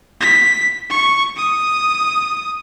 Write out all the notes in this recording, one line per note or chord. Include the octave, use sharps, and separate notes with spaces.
B6
C#6
D#6